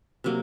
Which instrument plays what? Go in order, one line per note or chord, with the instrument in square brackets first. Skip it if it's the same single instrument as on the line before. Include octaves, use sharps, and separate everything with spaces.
[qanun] C3 F#3 A#3